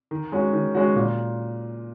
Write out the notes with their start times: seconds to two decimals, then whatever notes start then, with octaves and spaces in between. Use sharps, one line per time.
0.11 D#3
0.32 G#3 C#4 F#4
0.53 D#3
0.75 G#3 C#4 F#4
0.96 A#2